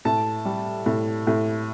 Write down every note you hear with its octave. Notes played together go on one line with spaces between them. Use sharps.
A2 A5
G3
A2
A2